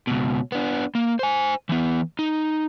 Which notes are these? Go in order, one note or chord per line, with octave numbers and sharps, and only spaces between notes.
C#2 B2
B3 D4
A#3
C5 G#5
E3 B3
D#4